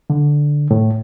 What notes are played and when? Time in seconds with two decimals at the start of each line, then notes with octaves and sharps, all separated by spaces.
0.10 D3
0.71 A2